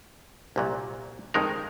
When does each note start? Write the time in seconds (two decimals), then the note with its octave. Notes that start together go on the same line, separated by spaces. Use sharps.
0.56 C2 A#2 F#3
1.34 F2 D#3 G#3 D#4 A#4